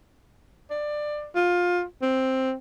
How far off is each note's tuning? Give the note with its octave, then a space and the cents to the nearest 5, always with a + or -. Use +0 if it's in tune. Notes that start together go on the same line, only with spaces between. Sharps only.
D5 +20
F4 +20
C4 +5